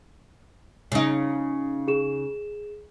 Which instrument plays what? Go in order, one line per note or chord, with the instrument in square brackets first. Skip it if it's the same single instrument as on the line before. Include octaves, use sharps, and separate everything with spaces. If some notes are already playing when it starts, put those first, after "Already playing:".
[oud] C#3 D#4 [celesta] G#5
[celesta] G#4 E7